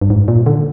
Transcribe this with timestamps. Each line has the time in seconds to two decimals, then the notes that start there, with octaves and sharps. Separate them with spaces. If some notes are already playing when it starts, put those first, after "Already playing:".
0.01 G2
0.10 G#2
0.28 A#2
0.46 D3